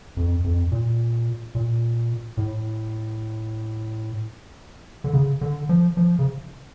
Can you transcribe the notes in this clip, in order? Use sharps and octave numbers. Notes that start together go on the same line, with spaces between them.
F2
F2
A#2
A#2
A2
D3
C#3
D3
F3
F3
C#3